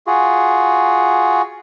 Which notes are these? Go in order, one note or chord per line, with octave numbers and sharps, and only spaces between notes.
F4 F#4 G#4